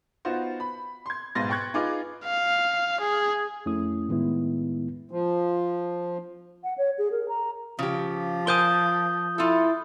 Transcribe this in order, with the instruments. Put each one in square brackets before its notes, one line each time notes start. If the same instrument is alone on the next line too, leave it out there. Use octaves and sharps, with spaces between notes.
[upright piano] B3 D#4 F4 F#4 C5
B5
C6 G#6
B1 G#2 B4 C6 A6 A#6
G5 C6 C#6 F#6 G#6
D#4 F4 G#4 B4 F5 D6
[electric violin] F5
G#4
[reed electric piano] F2 A3 C#4 E4 D#6
A2 D#3 G#3 B3 E4
[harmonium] F3
[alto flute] F#5
C#5
G#4
A#4
A#5
[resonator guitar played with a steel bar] C#3 G4 [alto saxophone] F3
[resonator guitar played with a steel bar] A#4 C5 G#5 [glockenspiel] D#6 G6 G7
[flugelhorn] E4 [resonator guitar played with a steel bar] F4 A4